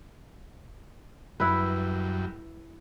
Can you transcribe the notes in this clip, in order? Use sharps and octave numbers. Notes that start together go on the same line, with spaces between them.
F#2 G3 E4 B4